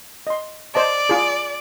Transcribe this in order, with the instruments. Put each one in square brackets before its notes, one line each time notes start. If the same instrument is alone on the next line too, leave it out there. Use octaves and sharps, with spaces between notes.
[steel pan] D#5 C6
[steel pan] C5 D#5 A5 [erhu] D5
[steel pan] F4 G#4